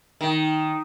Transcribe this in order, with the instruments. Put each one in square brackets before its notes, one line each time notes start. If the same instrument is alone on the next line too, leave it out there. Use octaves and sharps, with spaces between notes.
[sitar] D#3